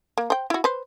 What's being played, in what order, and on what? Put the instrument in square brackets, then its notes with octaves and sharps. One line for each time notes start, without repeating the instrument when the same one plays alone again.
[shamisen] A#3
C5 G5
E4 F#4
B4 C5